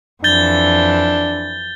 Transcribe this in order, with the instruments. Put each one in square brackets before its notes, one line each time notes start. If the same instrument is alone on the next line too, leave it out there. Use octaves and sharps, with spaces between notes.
[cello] F2 E3 [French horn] D4 [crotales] G6 A6 G7